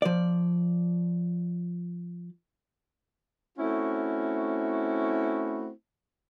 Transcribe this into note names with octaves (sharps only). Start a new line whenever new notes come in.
F3 D5
A3 C4 C#4 E4 F#4